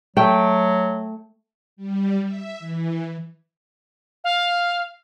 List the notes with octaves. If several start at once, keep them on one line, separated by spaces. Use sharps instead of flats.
F#3 A3 G5
G3
E5
E3
F5